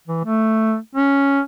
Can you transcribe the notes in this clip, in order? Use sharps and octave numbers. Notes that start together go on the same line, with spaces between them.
E3
A3
C#4